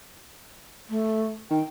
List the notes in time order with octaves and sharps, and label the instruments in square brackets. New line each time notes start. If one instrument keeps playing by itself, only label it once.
[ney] A3
[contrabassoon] D#3 [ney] G5